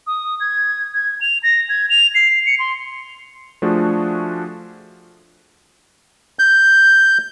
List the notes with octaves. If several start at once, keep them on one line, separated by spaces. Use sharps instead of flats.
D#6
G#6
G#6
F7
A#6
G#6
F7
C7
C#7
C6
F3 A3 D4 F4 F#4 G#4
G6